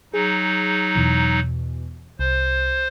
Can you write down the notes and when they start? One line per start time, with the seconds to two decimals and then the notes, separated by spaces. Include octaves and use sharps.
0.14 F#3 D#4 G#4
0.96 E2 B2 E3
2.19 C2 C5